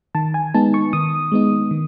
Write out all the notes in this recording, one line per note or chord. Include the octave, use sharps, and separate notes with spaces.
D#3 A5
G#5
G#3 B3 D#4 A5
C#6
D#3 D#6
G#3 B3 D#4
D#3